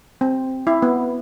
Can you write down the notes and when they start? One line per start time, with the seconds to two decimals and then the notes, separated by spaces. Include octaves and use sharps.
0.21 C4
0.67 E4
0.82 B3